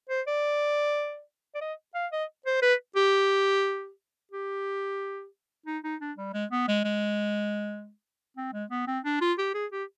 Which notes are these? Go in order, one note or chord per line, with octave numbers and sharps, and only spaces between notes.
C5
D5
D5
D#5
F5
D#5
C5
B4
G4
G4
D#4
D#4
D4
G3
G#3
B3
G#3
G#3
C4
G#3
B3
C4
D4
F4
G4
G#4
G4